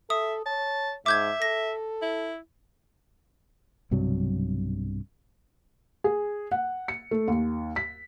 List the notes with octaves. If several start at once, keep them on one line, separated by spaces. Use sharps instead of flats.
A4 E5 D#6
C#5 A5
G#2 E5 D6 G6 G#6
A4 A#6
E4
B1 G2 C3 F#3
G#4
F#5
C#7
A3
D#2
B6